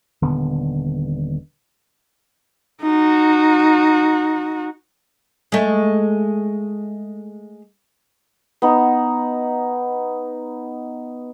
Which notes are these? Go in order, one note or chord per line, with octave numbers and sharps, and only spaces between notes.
D#1 D3 B3
D#4 F#4
G#3 A3
B3 D#4